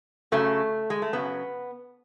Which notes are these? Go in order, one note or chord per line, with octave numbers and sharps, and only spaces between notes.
F#2 C#3 F#3 A3
G#3
A3
F#2 C#3 F#3 B3